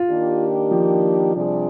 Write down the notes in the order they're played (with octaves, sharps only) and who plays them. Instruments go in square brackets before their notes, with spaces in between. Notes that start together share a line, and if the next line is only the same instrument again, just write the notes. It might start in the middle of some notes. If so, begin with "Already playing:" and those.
Already playing: [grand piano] F4
[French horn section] D#3 A#3 D4 G4
[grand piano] F3
[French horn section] C3 G3 D4 G#4 D5